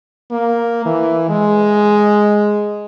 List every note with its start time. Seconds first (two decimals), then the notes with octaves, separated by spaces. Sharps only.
0.31 A#3
0.85 E3
1.30 G#3